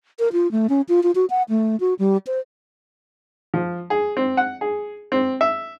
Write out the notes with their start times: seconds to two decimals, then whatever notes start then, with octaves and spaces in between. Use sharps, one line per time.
0.19 A#4
0.33 F4
0.52 A3
0.69 C#4
0.89 F4
1.03 F4
1.15 F#4
1.30 F#5
1.49 A3
1.80 F#4
1.99 G3
2.27 C5
3.54 F3
3.90 G#4
4.17 C4
4.37 F#5
4.61 G#4
5.12 C4
5.41 E5